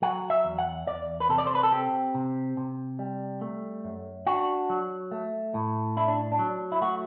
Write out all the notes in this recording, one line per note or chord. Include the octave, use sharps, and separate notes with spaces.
F#3 F#5
E5
E2
F#5
E2 D5
B4
C3 A4
D5
C5
B4
A4
C4 G4
C3
C3
G3
A3
F#2
D4 F#4
F#3
A3
A2
D4 E4
D4
D4
F#3
E4
A3 F#4